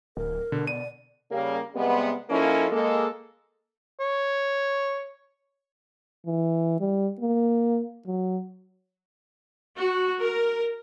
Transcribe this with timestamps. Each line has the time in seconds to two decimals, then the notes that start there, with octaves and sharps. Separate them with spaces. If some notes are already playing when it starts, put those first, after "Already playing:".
0.17 D1 A#4
0.52 B2 D3
0.67 D5 D#7
1.31 C#3 G3 A#3
1.75 C3 G3 G#3 B3
2.30 F3 A#3 C#4 D#4 E4 A4
2.70 G#3 A#3 A4
4.00 C#5
6.26 E3
6.80 G3
7.20 A#3
8.07 F#3
9.76 F#4
10.22 A#4